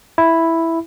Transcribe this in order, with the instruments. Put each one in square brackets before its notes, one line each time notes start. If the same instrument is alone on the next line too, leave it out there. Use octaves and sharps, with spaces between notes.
[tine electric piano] E4